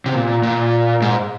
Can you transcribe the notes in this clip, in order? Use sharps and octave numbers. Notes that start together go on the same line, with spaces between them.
C3
A#2
A#2
G#2